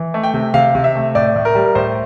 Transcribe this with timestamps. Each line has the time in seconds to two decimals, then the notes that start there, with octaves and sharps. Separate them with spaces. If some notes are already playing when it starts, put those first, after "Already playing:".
Already playing: E3
0.14 A3
0.23 G5
0.34 C3
0.54 C3 F5
0.75 C3
0.84 E5
0.95 A3
1.15 A2 D5
1.36 A2
1.45 A#4
1.55 G3
1.75 A2 C5